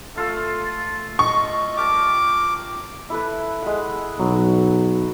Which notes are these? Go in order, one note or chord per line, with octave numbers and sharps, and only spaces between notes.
A3 F4 A4
D#5 C#6
G4 A#4 A5 D6
E4 A4 B4
G#3 F#5
B1 F#3